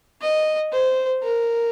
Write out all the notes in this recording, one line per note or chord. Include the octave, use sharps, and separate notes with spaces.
D#5
C5
A#4